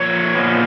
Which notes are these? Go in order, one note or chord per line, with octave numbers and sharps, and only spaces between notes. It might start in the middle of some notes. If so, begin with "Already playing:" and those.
Already playing: A#2 F3 C#5
A#2 F3 G#3 B3